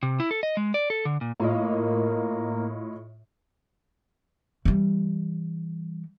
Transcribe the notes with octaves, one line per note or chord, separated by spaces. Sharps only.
C3
E4
A4
D#5
G#3
D5
A4
D3
A#2
A2 A#3 F4 D#5
E3 G3